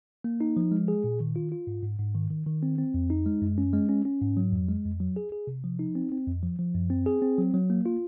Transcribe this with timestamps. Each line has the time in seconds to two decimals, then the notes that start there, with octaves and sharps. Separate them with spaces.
0.24 A#3
0.41 D#4
0.57 F3
0.72 G#3
0.88 G#4
1.04 A#2
1.20 D#3
1.36 F4
1.52 F4
1.67 G#2
1.83 G#2
1.99 G#2
2.15 D#3
2.30 D#3
2.46 D#3
2.63 C4
2.78 C4
2.94 F2
3.10 D#4
3.26 G#3
3.42 F#2
3.58 C#4
3.73 G#3
3.89 C#4
4.05 C#4
4.21 G#2
4.37 F#3
4.53 F2
4.68 G#3
4.85 F2
5.00 F#3
5.16 G#4
5.32 G#4
5.47 C3
5.64 F3
5.79 D#4
5.95 C4
6.12 C4
6.27 F2
6.43 F3
6.59 F3
6.75 F#2
6.90 C4
7.06 G#4
7.22 C4
7.38 F#3
7.54 F#3
7.70 A#3
7.86 F4